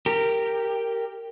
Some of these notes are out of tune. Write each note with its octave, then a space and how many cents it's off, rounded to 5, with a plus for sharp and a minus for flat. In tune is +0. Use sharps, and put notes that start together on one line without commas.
G4 +0 A#4 -10